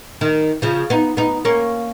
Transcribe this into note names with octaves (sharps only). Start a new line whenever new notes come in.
D#3
C#3 F3
B3 D#4
B3 D#4
A#3 C#4